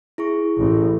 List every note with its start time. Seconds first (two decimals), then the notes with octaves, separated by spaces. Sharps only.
0.18 E4 G#4 C#6
0.59 A1